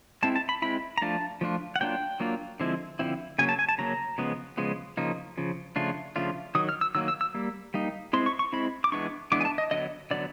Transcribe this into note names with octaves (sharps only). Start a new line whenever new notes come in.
G#3 C4 E4 A5
A5
B5
G#3 C4 E4 B5
A#5
F3 A3 D4 F4 A5
F3 A3 D4 F4
F#5
F#3 A#3 D4 F4 G5
F#3 A#3 D4 F4
D3 F3 G#3 C4 E4
D3 F3 G#3 C4 E4
C#3 F#3 A#3 C#4 G#5
A5
G#5
A5
C#3 F#3 A#3 C#4 A#5
C#3 F3 G#3 B3
C#3 F3 G#3 B3
C#3 F3 A#3 D#4
C#3 F3
C#3 F3 A3 D4 F4
C#3 F3 A3 D4 F4
D#3 F#3 D#6
F6
E6
D#3 F#3 A#3 E6
E6
E6
G3 A#3
G3 A#3 D#4
G#3 C4 E4 C6
C#6
C#6
G#3 C4 E4 B5
D6
E3 G#3 B3 D4 C#6
E3 G#3 B3 D4 D6
G#5
A5
D#5
D3 F#3 B3 D#5
D3 F#3 B3 D5